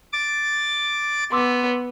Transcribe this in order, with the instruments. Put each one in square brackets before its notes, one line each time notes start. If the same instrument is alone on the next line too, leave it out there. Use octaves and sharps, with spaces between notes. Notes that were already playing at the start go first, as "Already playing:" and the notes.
[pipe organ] D6 A6
[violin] B3 [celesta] C6 D6 E6